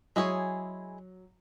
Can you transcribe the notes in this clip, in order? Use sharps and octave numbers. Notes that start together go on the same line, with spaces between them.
F#3 G#3 E4 G#4 C#5